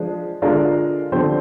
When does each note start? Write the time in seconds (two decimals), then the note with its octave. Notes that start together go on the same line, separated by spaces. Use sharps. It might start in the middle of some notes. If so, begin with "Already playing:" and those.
Already playing: F3 G#3 D4 G#4
0.42 D3 G#3 D4 F4 A#4
1.12 D3 F3 C4 G4 C5